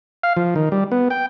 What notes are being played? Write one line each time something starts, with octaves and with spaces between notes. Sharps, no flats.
F5
F3
D#3
G3
B3
G5